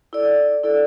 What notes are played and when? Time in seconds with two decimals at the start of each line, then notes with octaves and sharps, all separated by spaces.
0.13 E4 A4 D5
0.64 E4 A4 D5